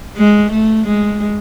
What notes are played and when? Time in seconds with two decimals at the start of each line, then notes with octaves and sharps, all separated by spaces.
0.18 G#3
0.52 A3
0.87 G#3